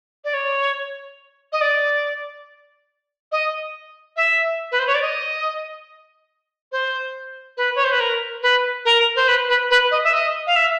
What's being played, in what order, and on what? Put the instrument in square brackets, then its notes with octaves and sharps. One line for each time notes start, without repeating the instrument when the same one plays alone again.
[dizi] D5
C#5
D#5
D5
D#5
E5
B4
C5
C#5
D5
D#5
C5
B4
C#5
C5
B4
A#4
B4
A#4
C5
B4
B4
B4
D#5
E5
D#5
F5
E5